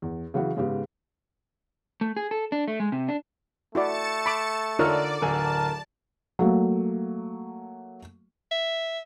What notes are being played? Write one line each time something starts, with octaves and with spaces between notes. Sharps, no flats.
E2
C#3 E3 F#3 F#5
G#2 C#3 B3 G4
A3
G#4
A4
D4
A3
G#3
C3
D4
A3 E4 F#4 D5 A6 C#7 E7
B5 D6
D3 D#4 F4 A#4 C#5 D5 F6
D1 D3 A#4 G#5 A5
F#3 A3 A#3
E5